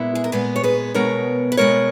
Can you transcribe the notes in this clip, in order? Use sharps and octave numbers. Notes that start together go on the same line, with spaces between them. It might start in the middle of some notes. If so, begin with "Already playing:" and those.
Already playing: A#2 G#3 B3 E4
G#4
A#4
A#2 G#3 B3 G#4 B4
C#5
G#4 B4
B2 G#3 B3 A#4 C#5
B4
B2 G#3 B3 A#4 C#5